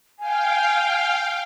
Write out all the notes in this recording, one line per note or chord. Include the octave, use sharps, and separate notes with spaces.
F5 G5 G#5